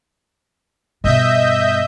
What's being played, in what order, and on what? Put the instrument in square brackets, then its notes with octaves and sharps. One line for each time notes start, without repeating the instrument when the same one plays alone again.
[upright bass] G2 B2 [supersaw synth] D#5 E5 G6